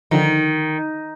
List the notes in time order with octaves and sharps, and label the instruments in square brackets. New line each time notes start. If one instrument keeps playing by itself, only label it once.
[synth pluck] D3 F3 [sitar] D#3